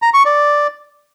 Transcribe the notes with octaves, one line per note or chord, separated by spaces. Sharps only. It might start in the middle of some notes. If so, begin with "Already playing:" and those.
A#5
C#6
D5